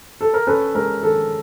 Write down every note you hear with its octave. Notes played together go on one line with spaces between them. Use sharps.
A4
A#4
C#4 A4 B4
G#3 A#4
D#3 A4